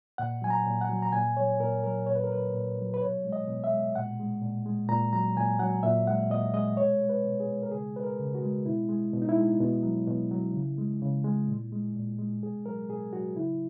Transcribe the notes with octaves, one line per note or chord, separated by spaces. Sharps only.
A#2 F#5
F#3 G#5
A#5
A#2
F#5
F#3
A#5
A#2 G#5
F#3 C#5
A#2 A#4
F#3 A#4
A#2 C#5
B4
A#4
F#3 B4
A#2
F#3
B4
B2 C#5
G#3
D#5
B2
E5
G#3
A#2 F#5
G#3
A#2
G#3
A#2 A#5
F#3 A#5
A#2 G#5
F#3 F#5
A#2 E5
G#3 F#5
A#2 D#5
G#3 D#5
B2 C#5
G#3
B4
B2
G#4
G#3
A#4
C#3 G#4
G#3 B4
A#4
C#3
F#4
G#3
B2 E4
G#3
B2
D#4
E4
G#3
B2
F#3
B2
F#3
C#3
G#3
C#3
G#3
A#2
G#3
A#2
G#3
B2 G#4
F#3 A#4
B2 G#4
F#3 F#4
C#3 E4